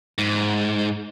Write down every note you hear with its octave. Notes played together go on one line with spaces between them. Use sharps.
G#2